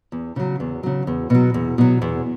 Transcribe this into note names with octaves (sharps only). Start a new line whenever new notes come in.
E2
C#3 F#3
E2
C#3 F#3
E2
B2 F#3
E2
B2 F#3
E2